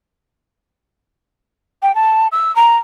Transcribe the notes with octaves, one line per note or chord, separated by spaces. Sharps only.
G5
A5
E6
A#5